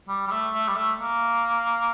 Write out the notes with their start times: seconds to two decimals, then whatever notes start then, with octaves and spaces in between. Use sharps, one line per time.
0.08 G3
0.27 G3
0.31 A3
0.53 A3
0.67 G3
0.76 A3
0.99 A#3